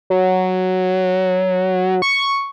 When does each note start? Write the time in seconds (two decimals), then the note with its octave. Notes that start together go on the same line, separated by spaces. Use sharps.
0.10 F#3
2.02 C#6